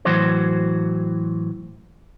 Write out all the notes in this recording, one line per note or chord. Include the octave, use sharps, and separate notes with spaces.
A2 E3 F#3 F#4 C5